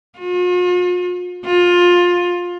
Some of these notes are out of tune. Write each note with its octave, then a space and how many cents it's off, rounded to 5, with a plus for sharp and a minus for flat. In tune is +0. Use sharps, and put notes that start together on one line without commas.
F4 +45
F4 +20